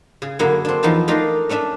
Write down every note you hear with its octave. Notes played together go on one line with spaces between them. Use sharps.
C#3 G#4
F#2 D3 A#3 E4 G#4 F#5
C4 D4
E2 F3 B3 D#4 A5
A3 D4 D#4 A#4 F5 C6
A3 C#4 D4 E5